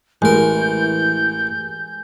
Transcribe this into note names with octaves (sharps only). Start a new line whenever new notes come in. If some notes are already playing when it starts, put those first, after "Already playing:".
A1 E3 G#3 A#4 G6